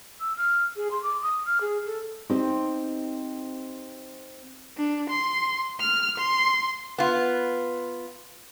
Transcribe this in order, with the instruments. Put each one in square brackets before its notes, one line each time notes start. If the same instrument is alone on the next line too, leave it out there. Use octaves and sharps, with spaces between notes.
[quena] E6
F6
G#4
C6
D6
D#6
F6
G#4
A4
[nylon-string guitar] C4 D#4 G4 C5
[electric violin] D4
C6
F6
C6
[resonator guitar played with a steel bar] B3 F4